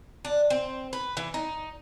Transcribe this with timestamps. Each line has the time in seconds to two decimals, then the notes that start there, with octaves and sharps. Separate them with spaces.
0.25 D4
0.50 C4
0.93 B4
1.17 E3
1.34 D#4